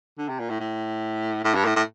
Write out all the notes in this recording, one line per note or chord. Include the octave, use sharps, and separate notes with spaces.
D3
C3
A#2
A2
A2
A2
G2
A2
A2